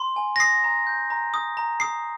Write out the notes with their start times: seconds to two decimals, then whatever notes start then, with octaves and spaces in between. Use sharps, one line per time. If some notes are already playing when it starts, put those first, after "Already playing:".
Already playing: C6
0.16 G#5
0.36 A#6
0.40 D#6 C7
0.64 A#5
0.87 G6
1.10 A#5
1.34 D#6
1.57 A#5
1.80 D#6 C7